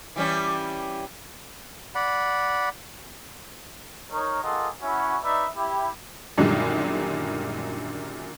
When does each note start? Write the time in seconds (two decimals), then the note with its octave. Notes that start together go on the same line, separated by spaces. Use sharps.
0.16 E3 G3 C#4
1.95 D5 F#5 B5
4.11 D#4 A#4 C#5
4.43 A#3 F4 G#4 A4 D#5 F#5
4.82 C#4 E4 F#4
5.23 D#4 B4 D5 E5
5.56 E4 G4
6.38 F#2 A#2 D3 D#3 G3 G#3